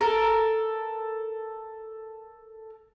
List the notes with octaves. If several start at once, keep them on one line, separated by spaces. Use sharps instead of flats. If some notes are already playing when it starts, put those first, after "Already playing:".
A4 A#4